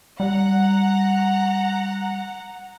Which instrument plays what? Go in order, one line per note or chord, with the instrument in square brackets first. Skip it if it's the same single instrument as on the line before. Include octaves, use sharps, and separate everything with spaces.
[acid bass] G3 [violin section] F#5 A#5